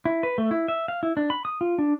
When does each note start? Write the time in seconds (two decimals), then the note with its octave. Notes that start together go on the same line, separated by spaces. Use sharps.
0.05 E4
0.23 B4
0.38 A3
0.51 E4
0.68 E5
0.88 F5
1.03 E4
1.17 D4
1.30 B5
1.45 D#6
1.61 F4
1.78 D4